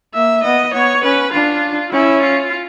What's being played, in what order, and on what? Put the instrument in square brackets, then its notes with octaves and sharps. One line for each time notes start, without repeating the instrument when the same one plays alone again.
[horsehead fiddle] A#3 [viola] E5
[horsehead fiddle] B3 [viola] D#5
[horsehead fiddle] B3 [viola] C#5
[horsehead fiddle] C#4 [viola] B4
[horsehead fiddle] D4 [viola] F4
[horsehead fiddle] C#4 [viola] E4
[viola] F4